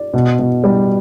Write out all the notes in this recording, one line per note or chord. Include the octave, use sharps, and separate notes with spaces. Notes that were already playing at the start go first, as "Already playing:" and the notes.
Already playing: D5
B2
B2
G3